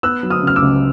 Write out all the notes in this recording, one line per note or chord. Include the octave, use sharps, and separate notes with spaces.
B3 E6 F#6
F#3
D#6 F6
C#3 F6
D6 E6
C#2